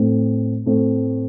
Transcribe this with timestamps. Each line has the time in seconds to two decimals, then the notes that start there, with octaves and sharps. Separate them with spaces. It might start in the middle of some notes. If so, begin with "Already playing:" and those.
Already playing: A2 A3 C4
0.66 A2 A3 C4